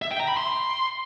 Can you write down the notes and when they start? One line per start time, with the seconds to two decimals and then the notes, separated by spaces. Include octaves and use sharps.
0.02 E5
0.11 G5
0.20 A#5
0.28 B5
0.37 C6